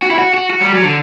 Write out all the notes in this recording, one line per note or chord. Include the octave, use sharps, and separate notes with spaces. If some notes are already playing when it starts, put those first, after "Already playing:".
F#4
E4
F#4
F#4
F#4
G3
F#3
D3